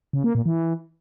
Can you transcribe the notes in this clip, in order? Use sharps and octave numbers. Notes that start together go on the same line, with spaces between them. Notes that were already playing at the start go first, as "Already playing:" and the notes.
C#3
A#3
A#2
E3